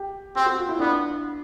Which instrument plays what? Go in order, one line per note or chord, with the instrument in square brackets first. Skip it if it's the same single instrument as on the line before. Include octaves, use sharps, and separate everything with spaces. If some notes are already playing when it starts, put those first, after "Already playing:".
Already playing: [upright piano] G4
[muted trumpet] C4 [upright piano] G4
[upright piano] F#4
F4
E4
[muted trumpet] B3 [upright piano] D4